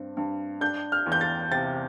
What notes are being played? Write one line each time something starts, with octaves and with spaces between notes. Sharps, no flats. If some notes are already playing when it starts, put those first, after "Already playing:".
Already playing: G2 C4
G2
D4 G6
F6
E2
G6
A6
C3 A6